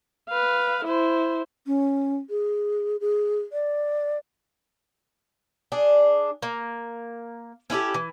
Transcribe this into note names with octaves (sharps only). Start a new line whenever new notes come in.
B4 F5
E4 C5
C#4
G#4
G#4
D5
D4 G#4
A#3
C#4 E4 G4 A4
E3